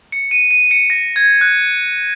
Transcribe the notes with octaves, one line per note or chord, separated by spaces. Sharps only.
C#7
D#7
D#7
C#7
A#6
G#6
F#6